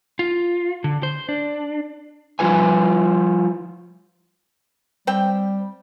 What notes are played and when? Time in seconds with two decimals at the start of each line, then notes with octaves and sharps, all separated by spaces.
0.19 F4
0.84 D3
1.03 C5
1.29 D4
2.39 F3 G3 F4 B4 G#5
5.07 G3 C4 G5